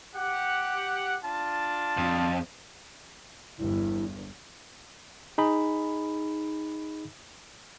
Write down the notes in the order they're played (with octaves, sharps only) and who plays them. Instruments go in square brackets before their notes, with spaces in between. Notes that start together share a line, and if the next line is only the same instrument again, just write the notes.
[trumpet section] G4 F#5
D4 F4 A5
[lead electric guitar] F2
[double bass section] G1 E2 G2 [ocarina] E4
[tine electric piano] D#4 G#4 B5